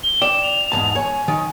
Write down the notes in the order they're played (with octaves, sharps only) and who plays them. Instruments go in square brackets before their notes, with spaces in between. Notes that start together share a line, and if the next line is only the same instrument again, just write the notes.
[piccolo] G7
[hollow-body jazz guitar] D5 G5 [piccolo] E7
[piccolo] F7
[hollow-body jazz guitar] E2 G#2 A5
[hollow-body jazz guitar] C#5 [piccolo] G#5
[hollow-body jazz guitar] D#3